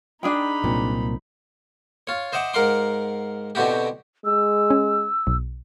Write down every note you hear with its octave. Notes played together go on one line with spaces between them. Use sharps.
D4 D#4 G#4 G5 B5
C2 A#2 F#3 C4
F4 C#5
C5 D#5 E5 F#5 D6
G#2 A#4 F5 F#5 C6 D6
B2 D3 C4 E4 F#4 G4
G#3 E6
C#4
B1